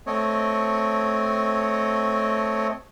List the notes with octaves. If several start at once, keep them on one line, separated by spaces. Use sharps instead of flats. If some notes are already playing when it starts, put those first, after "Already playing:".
A3 C4 C#5 D#5